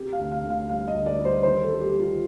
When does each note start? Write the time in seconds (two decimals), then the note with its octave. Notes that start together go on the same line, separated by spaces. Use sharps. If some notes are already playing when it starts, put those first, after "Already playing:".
Already playing: C3 G4
0.13 F5
0.20 D2
0.31 F5
0.44 D2
0.50 F5
0.69 G3 F5
0.87 D#5
0.93 D2
1.06 D5
1.19 G3
1.25 C5
1.43 D#3 C5
1.63 A4
1.69 G3
1.81 G4
1.93 D#3
1.99 F4